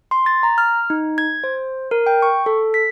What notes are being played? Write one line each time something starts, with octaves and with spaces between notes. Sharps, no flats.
C6
A6
A#5
F6
D#4
G#6
C5
A#4
G5
C#6
A4
B6